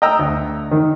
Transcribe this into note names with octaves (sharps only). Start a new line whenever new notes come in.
D#5 G5 A#5 E6
D2
D#3